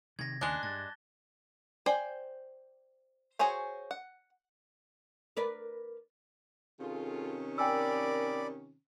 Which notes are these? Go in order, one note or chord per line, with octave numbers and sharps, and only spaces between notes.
C3 D#3 G#6 A#6
D#2 C#3 G#3 D4 A5 F#6 G7
G2 A6
C5 D5 G5 G#5
F#4 G#4 C5 C#5 G#5
F#5
A#4 B4 D5
C3 D#3 C#4 F4 G#4 A4
A#4 D5 G5 G#5 B5 D6 E6